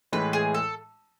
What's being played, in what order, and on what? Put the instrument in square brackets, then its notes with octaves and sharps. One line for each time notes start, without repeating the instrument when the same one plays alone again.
[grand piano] A2 E3 G#3 [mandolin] B4
[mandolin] G#4
A4